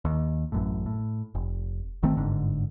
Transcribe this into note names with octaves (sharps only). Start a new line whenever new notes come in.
D#2
A1 F#2 A2
A2
F1
G#1 D#3 A3 C4
G1 G#2 D3